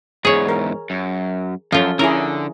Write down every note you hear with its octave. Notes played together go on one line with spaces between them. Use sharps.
E2 G#2 G#4 C#5
A#4
F#2
F#2 F3 C#4 F4 A4
D3 C#4 E4 G#4 A#4